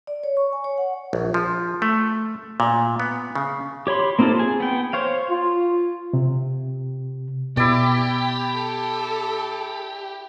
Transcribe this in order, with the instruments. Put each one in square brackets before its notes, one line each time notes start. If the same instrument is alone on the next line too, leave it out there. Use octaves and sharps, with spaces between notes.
[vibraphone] D5
C#5
C#6
G#5
C#5
F#5
[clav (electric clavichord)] A#1
F3
A3
A#2
B3
C#3
[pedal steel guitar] G4 C#5 B5 C6
A#3 C4 D#4 F4 A4
G#4
B3 G5
C5 C#5 F5
[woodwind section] F4
[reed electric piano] C3
[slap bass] B2 [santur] E4 D5 [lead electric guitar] G4
[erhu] A4